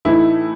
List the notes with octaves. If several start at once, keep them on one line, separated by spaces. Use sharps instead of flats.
A2 E3 A3 D#4 E4